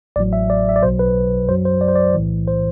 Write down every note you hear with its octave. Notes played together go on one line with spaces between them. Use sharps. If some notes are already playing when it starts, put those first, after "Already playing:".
A1 A2 F#3 D5
E5
D5
E5
D5
B1 B2 F#3 C5
B4
F#2 F#3 C5
C5
D5
C5
D5
B1 A2 E3
C5